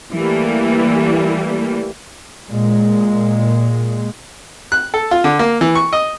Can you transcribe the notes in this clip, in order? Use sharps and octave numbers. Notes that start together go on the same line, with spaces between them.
E3 G3 A3 A#3
A#2 G#3
F#6
A4
F4
D3
A#3
E3
C#6
D#5